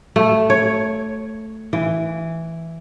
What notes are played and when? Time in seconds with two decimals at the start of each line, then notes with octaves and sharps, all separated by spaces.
0.16 A3
0.50 C#5
1.73 E3